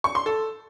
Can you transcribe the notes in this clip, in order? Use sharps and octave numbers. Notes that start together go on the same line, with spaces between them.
C#6
C6
A4